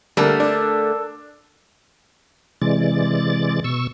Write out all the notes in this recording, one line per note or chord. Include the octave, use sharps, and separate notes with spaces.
D3 G3 A3 A#3 A4 A#4
D4
C3 E3 G#3 D5 A6
B2 C#6 E6